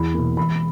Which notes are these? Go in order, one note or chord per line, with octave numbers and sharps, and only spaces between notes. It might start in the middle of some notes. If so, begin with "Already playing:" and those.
Already playing: E2 B5
B2 A#3
E1 B5